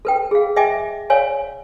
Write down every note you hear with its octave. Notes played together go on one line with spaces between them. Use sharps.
A4 B4 G5
G#4 F5
D#5 E5 G5 G#5 D6
C#5 D5 F5 G#5